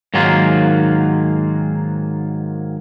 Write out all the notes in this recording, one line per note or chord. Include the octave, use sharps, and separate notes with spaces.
G#2 D#3 F#3 A#3 F4